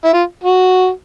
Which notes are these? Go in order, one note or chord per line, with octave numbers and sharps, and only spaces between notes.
E4
F4
F#4